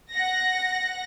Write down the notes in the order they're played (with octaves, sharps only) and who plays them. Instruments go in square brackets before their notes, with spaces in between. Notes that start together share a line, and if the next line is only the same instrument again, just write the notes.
[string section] F#5 A#6